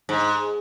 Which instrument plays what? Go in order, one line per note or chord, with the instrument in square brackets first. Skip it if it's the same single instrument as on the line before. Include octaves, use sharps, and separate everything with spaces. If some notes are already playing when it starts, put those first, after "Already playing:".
[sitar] G#2